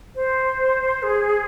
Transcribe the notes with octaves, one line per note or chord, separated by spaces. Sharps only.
C5
G#4